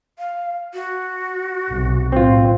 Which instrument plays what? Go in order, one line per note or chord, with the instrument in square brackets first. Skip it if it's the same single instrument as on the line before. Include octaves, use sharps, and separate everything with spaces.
[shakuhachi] F5
F#4
[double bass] B1 C3
[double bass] A2 [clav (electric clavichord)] C4 F4